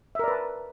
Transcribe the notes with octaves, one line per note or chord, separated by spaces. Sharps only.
A#4 B4 D5 E5 A5